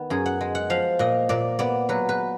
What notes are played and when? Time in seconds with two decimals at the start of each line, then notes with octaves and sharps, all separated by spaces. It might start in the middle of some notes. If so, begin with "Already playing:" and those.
Already playing: D#3 B3
0.10 F#2 G#4
0.26 F#5
0.41 G#3
0.55 F#5
0.70 F3 F5
0.99 A#2 D#5
1.29 A#2 D5
1.59 B3 D5
1.89 F#3 B4
2.09 B4